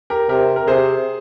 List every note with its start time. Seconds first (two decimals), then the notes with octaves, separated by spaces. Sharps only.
0.10 G4 A#4
0.29 C3 G4 A#4
0.56 A#4
0.67 C3 G#4 C5